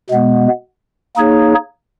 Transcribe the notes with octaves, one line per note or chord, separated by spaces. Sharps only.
B2 G#3 B3
A#3 D#4 G#4 C#5